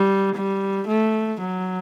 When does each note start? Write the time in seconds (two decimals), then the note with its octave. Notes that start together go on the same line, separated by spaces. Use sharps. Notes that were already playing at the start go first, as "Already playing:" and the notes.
Already playing: G3
0.35 G3
0.87 A3
1.40 F#3